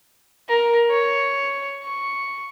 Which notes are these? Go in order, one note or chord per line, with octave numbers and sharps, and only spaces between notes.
A#4
C#5
C#6